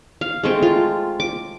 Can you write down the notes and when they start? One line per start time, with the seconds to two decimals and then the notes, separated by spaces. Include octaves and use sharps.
0.21 F5
0.43 G#3 A3 C4
0.62 F4
1.20 D6